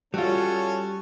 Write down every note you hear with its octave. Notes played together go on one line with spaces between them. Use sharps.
G3 C#4 F4 F#4 A4 C#5